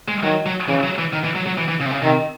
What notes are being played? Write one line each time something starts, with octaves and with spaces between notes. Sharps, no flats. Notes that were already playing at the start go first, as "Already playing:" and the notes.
G#3
D#3 F#3
F#3
C#3 E3
F#3
E3
D#3
E3
F#3
F#3
E3
E3
C#3
C3
C#3
C3 D#3